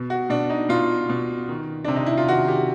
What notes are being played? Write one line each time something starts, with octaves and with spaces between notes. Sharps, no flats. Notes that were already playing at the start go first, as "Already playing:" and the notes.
Already playing: B2
F#4
B2 D4
D#4
B2 F4
B2
D#3
C3 D4
D#4
E4
F4
D#3 F#4
G4